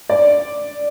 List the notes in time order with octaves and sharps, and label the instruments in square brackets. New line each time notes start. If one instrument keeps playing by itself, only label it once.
[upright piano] D5